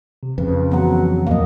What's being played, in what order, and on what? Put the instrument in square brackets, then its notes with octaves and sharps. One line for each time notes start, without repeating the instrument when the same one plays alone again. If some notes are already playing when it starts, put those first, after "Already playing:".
[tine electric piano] C3
[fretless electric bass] F2 C#3 [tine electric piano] B4
[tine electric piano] E3 A#5 [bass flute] F#3 [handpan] B3 F#5
[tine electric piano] D#2 G#2 F3 [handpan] A#3 D#5